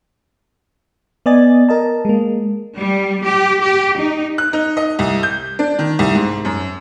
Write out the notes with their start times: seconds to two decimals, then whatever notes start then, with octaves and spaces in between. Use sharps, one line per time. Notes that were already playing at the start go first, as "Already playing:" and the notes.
1.26 B3 D5 D#5 G#5 A6
1.69 A#4 D#5 A5
2.05 G#3 A#3
2.76 G3
3.24 G4
3.62 G4
3.98 D#4
4.38 F#6
4.53 D#4
4.77 D#5
4.99 C2
5.23 G6
5.59 D4
5.79 D#3
5.99 C2
6.15 G#2
6.45 F#2